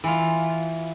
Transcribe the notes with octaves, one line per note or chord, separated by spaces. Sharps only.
E3 F4